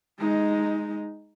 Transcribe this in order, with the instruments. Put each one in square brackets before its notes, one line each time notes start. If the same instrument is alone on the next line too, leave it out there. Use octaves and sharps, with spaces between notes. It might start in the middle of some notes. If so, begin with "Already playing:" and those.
[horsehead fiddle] G#3 D#4